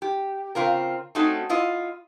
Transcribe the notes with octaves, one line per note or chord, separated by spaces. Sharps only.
G4
C#3 C4 F4 A#4
A3 C4 C#4 D#4 F#4
E4 F4 D#5